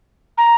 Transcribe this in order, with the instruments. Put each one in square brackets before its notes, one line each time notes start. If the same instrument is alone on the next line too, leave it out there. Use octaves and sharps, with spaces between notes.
[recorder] A#5